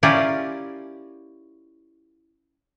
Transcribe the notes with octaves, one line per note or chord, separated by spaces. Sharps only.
C#4 E4 F4 G4 A#4 D5